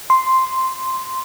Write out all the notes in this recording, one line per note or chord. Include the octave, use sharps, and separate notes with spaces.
C6